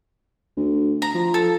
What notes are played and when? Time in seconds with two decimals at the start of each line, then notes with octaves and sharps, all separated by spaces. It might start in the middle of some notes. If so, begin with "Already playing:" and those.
0.57 D2
1.02 A#5
1.15 F3
1.34 A4